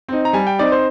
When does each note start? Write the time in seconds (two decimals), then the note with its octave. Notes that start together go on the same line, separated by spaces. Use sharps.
0.08 C4 D#4
0.25 A#5
0.33 G3 G#5
0.47 G5
0.59 C4 D#4 D5
0.72 C5